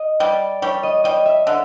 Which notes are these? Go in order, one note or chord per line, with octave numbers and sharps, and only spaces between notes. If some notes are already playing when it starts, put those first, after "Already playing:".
Already playing: D#5
G3 D5
G3 C#5
D#5
G3 D#5
E5
D3 E5